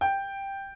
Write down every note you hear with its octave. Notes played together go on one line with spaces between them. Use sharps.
G5